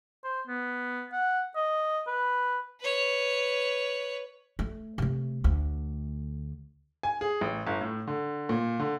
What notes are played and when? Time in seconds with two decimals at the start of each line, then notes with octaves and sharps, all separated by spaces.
0.24 C5
0.47 B3
1.13 F#5
1.56 D#5
2.07 B4
2.80 B4 C#5
4.59 A3
4.98 C3 A3
5.44 D2 A3
7.03 G#5
7.21 G#4
7.41 A1
7.67 G1
7.81 A2
8.07 D3
8.49 A#2
8.80 D3